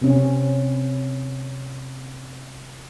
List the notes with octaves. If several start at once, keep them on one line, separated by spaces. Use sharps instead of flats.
C3 C4 C#4